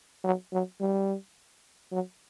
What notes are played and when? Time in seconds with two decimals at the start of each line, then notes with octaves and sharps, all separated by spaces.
0.24 F#3
0.53 F#3
0.81 G3
1.92 F#3